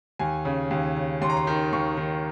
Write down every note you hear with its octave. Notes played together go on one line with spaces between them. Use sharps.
D#2 G#5
C#3
D#2
C#3
D#2 C6
A#5
C6
D#3
D#2 C#6
D#3